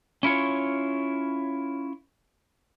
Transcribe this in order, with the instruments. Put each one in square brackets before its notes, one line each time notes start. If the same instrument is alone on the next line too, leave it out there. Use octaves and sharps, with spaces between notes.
[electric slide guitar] C#4 E4 F4 C#5